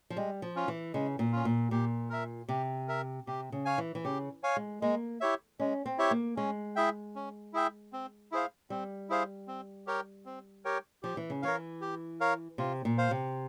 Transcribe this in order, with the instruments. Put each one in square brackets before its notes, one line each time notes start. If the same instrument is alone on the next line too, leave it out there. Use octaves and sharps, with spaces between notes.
[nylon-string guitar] F3
[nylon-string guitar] G3 [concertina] G#3
[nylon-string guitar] F3
[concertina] C#4 F4
[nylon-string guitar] E3
[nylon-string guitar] C#3 [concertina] G#3
[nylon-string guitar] A#2
[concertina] C#4 F4
[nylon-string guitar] A#2
[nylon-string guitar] A#2 [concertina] G4
[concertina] A#4 E5
[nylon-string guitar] C3 [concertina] G4
[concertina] A#4 E5
[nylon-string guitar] C3 [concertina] G4
[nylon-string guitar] C#3
[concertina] C#5 F5 G#5
[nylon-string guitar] E3
E3
[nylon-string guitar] C#3 [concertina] G4
[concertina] C#5 F5 G#5
[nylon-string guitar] G#3
[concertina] G#3 [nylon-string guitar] A#3
[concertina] E4 G4 C#5 E5
[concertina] G#3 [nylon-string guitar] C#4
[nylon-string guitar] C4
[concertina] E4 G4 C#5 E5
[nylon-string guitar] A#3
[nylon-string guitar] G#3 [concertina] C#4
[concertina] E4 G#4 E5 G5
C#4
E4 G#4 E5 G5
C4
E4 G#4 C5 F5
[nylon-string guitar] G3 [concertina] C4
[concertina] E4 G#4 C5 F5
C4
G4 A#4 C#5 G5
C4
G4 A#4 C#5 G5
[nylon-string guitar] F3 [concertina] G4
[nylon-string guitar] E3
C#3
[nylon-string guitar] E3 [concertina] A#4 C#5 F5
[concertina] G4
A#4 C#5 F5
[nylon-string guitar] C3 [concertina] F4
[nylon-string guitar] A#2
[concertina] C5 F5
[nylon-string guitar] C3